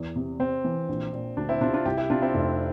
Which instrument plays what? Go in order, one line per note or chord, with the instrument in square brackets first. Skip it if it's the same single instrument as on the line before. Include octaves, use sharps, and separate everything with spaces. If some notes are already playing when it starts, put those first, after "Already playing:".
Already playing: [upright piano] E2
C3
[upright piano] C3 [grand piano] C4
[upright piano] E3
A#1
A#2
[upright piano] D2 [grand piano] D4
[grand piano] C4 E4
[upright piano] C3 [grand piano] D4 F4
[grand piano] D4 F4
[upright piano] C2 [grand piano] E4 G4
[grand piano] E4 G4
[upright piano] C3 [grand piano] D4 F4
[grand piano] C4 E4
[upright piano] F1